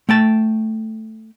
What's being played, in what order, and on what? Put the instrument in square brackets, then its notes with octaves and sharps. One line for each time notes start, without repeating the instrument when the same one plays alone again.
[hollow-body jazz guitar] A3 G5 A5